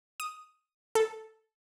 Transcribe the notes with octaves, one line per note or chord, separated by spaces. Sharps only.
D#6
A4